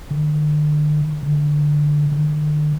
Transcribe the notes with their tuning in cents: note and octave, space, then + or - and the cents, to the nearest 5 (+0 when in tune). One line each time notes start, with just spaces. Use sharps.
D3 +40
D3 +10
D3 +40